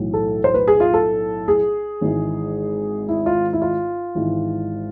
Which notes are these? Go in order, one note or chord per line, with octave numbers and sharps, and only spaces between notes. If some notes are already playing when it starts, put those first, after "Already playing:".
Already playing: B1 A2 E3
A4
C5
B4
G#4
F4
A4
G#4
G#1 G#2 E3
E4
F4
E4
F4
G#1 G#2 E3